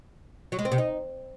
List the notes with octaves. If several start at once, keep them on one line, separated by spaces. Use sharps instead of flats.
F#3
G#3
C4
C3
D#4